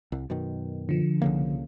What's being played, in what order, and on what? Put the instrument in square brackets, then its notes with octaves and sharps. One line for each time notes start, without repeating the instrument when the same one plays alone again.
[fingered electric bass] C2
F#2 B2 D#3
[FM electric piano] D3 F3
[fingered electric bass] C2 C#3 A#3